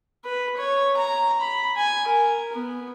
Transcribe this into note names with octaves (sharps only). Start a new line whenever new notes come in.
B4
C#5
A#5
B5
G#5
A#4
B3